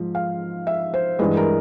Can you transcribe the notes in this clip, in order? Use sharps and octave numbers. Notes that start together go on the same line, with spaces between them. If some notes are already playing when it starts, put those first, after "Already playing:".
Already playing: G#2 F3
F5
E5
C5
G2 E3 G#3 B4
A#4